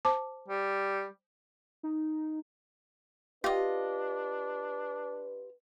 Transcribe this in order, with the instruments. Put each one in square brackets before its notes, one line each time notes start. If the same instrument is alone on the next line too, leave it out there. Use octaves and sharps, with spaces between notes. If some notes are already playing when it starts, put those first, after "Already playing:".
[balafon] C5 A5 D6
[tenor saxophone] G3
[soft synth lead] D#4
[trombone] D4 [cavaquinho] F4 D#5 [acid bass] G4 [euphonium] B4